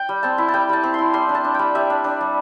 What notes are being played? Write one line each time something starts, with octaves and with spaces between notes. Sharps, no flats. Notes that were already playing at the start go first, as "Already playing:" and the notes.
Already playing: G5
G3
C4 A5
E4
A5
G3 G5
G3 A5
C4
E4 C6
G3 C6
D4
A5
D4
G3 G5
G3 E5
D4
D4
G3